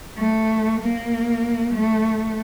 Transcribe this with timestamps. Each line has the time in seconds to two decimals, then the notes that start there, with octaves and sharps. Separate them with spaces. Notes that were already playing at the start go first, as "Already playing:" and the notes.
0.17 A3
0.80 A#3
1.74 A3